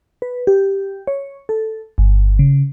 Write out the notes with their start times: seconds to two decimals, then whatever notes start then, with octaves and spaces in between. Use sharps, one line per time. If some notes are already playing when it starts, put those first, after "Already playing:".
0.22 B4
0.47 G4
1.07 C#5
1.49 A4
1.98 G1
2.39 C#3